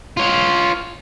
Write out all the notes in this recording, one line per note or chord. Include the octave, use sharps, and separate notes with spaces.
F4 C#5